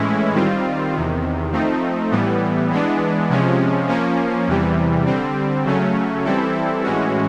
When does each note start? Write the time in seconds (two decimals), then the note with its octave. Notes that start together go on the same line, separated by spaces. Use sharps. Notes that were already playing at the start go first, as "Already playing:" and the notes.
Already playing: A2 E3 G#3 C#4 E4
0.35 D#3 G3 C4 F4
0.94 E2 C3 D#3
1.52 F3 A3 C4 D#4
2.11 A2 E3 G3 B3
2.70 E3 G#3 B3 D4
3.30 C3 F3 G#3 C#4
3.88 F3 A#3 C#4
4.47 E2 C3 E3 G3
5.06 D3 G3 C4
5.65 C#3 F#3 A3 C#4
6.24 E3 G3 C4 E4 A4
6.83 A2 E3 G#3 C#4 F#4